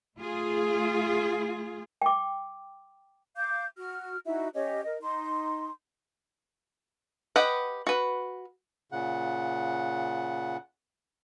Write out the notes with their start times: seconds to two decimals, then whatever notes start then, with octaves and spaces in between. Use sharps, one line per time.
0.17 A3 F4 G#4
2.02 G5 D6
3.36 F5 D6 G6
3.77 F#4 F6
4.25 D#4 E4 F#4 E5
4.54 C#4 G4 C#5 D#5
4.84 A#4 D#5
5.01 D#4 C6
7.36 G4 B4 D#5 F#5
7.87 F#4 B4
8.92 A#2 C#3 F#5